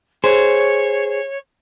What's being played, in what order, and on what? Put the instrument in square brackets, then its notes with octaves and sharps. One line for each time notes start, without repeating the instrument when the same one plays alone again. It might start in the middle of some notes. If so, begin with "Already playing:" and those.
[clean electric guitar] G#4 C5 [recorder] C#5